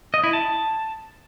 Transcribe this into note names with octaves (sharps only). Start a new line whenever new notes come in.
D#5
E4
A5